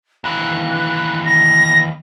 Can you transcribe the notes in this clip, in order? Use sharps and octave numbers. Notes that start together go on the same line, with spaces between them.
D#2 E3 F#6
A#6